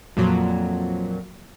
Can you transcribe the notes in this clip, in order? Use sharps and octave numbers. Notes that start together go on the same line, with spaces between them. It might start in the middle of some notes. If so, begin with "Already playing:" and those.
F2 A#2 F#3